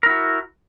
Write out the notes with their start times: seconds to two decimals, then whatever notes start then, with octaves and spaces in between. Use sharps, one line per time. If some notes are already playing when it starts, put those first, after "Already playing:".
0.03 A#4
0.06 E4
0.09 F#4